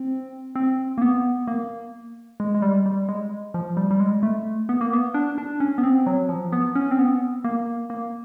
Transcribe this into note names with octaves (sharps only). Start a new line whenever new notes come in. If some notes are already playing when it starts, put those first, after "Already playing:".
Already playing: C4
C4
A#3
B3
A#3
G#3
G#3
G3
G3
G#3
F3
G3
G3
G#3
A3
B3
A#3
B3
D4
D4
C#4
B3
C4
F#3
F3
B3
C#4
C4
B3
A#3
A#3